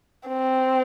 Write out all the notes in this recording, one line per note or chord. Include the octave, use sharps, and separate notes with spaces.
C4